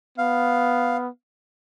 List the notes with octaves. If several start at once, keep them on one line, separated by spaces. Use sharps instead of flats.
B3 F5